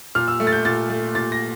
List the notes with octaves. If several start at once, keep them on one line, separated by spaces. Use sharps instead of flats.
A#2 F6
E6
A3
A6
G6
A#2 A6
A3
A#2 A6
A#6